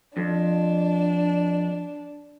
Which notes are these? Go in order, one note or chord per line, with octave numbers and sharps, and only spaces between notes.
F2 D4